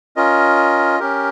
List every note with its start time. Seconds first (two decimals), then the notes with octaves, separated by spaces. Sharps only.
0.16 C#4 F4 A#4 D#5
0.99 C#4 G4 A#4